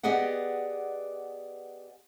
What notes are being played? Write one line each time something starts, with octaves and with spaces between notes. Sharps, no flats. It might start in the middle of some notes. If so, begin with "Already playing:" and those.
B3 G4 G#4 D5 D#5 F#5